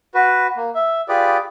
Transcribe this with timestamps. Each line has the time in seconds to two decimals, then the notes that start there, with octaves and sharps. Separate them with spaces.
0.14 F#4 B4
0.57 A#3
0.75 E5
1.09 F4 G4 G#4 B4 D5